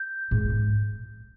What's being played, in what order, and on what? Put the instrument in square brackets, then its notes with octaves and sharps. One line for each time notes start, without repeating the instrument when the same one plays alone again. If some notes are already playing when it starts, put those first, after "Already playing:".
Already playing: [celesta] G6
[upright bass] G#2